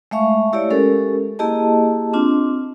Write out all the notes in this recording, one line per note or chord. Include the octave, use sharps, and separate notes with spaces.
G#3 A3 E5 F5 C#6
A3 E4 G4 C#5 D5
G#3 C#4 G4 A4 A#4
A#3 E4 G4 G#4 D#5 A5
C4 D4 F4